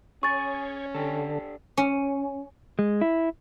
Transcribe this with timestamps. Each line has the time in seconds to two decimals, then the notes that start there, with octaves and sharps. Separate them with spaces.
0.23 C#4 G#4 C#5 C#6 A6
0.95 D3 D4 G4 A4
1.77 C#4
2.79 G#3
3.01 E4